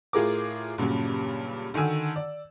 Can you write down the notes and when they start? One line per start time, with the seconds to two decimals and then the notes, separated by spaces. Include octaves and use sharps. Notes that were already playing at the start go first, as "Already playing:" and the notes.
0.13 A2 F4 G#4 A#4 D6
0.78 G2 A#2 C#3 F#3
1.74 D3 D#3 F#4 G#5 E6
2.16 D5